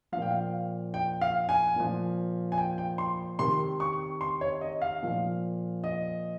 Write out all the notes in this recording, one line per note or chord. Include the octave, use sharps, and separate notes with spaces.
A#2 F3 F5
G5
F5
G5
F5
G#5
A#2 F3
G#5
G5
G5
C6
C3 D#3 C6
C#6
C6
C#5
D#5
F5
A#2 F3
D#5